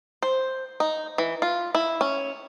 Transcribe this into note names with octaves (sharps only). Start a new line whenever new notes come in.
C5
D#4
E3
F4
E4
C#4